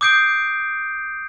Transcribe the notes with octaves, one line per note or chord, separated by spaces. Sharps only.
D6 D#6 G6 C7 D7